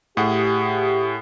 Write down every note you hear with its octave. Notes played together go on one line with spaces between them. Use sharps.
A2 G4 G#4 F#5